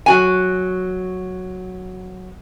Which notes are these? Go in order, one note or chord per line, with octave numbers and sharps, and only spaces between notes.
F#3 F#4 G#5